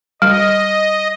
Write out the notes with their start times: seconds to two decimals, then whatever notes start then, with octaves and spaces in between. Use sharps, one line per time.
0.22 G3 D#5